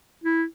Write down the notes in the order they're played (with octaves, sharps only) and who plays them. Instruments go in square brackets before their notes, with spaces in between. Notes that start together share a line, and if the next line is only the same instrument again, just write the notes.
[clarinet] E4